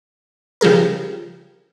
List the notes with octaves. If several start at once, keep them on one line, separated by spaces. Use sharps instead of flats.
C#3 F3 G3 G#4 A#4